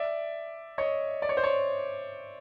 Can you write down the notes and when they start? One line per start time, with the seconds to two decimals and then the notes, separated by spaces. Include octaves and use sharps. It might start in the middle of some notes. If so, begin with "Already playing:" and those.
Already playing: D5 E5
0.78 C#5 D#5
1.22 D5
1.29 C#5
1.37 C5
1.44 C#5